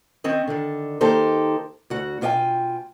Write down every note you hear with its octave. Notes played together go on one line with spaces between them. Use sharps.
D#3 C4 C#4 D#5
D3 D#3
D#3 A#3 D#4 G4 A4 C5
D2 F#4
B2 F4 C#5 D#5 G5 G#5